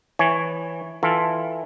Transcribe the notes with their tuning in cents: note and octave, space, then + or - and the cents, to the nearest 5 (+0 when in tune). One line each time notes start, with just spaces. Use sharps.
E3 +0 C#5 +0 G#5 -10
E3 -5 F4 +0 A4 +0